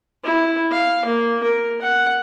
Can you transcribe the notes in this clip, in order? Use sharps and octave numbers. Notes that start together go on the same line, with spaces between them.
E4
F5
A#3
A#4
F#5